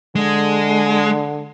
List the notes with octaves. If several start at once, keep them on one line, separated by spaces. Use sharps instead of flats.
D3 G#3